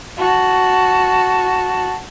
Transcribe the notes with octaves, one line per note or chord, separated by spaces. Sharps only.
F#4 A5